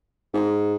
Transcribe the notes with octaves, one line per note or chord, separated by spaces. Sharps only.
G#2